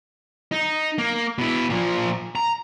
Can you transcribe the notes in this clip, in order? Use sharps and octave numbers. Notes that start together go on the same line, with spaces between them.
D#4
A#3
B2 E4
A#2 F3
A#5